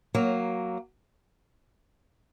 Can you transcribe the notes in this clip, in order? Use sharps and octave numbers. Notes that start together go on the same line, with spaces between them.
F#3 A#3